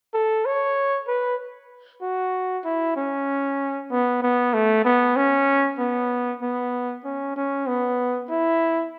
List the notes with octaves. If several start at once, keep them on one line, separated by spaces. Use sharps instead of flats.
A4
C#5
B4
F#4
E4
C#4
B3
B3
A3
B3
C#4
B3
B3
C#4
C#4
B3
E4